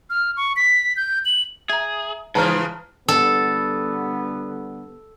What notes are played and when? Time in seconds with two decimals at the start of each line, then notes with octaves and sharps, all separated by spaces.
0.10 F6
0.37 C#6
0.56 B6
0.97 G6
1.25 F#7
1.70 G#4 E5 A#5
2.35 G#2 C#3 E3 F3 B4 A5 A#5 F6
3.08 D3 G3 B3 A4